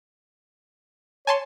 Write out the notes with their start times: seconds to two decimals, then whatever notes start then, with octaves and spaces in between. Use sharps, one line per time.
1.27 C#5 G#5 A5 C6